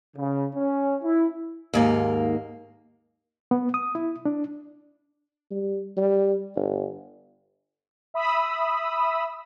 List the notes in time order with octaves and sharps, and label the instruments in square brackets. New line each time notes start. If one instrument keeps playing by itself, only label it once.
[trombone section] C#3
C#4
E4
[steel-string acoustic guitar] D#2 G#2 A#3
[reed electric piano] B3
D#6
E4
D4
[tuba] G3
G3
G1
[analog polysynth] E5 B5 D#6 E6